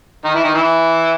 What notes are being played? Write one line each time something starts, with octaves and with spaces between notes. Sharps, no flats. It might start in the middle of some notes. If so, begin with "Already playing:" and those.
D#3 D#4
E3 E4
D#3 D#4
E3 E4